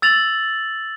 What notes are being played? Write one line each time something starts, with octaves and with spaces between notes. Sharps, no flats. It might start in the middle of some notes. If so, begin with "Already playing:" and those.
E6 A6 F7 F#7